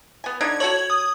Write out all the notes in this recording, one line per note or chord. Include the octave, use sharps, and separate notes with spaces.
B3 G#5
D3 D4 D#4 G#6
F#4 A4 C#5 G#6 F#7
D#6